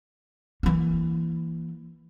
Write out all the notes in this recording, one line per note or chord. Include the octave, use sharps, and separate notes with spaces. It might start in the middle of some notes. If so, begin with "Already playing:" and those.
E3 A#3